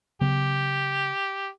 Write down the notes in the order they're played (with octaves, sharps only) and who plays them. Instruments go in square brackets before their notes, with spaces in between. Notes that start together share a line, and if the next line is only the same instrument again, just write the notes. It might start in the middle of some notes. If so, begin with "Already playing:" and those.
[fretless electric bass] C#3 F#3 B3 [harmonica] G4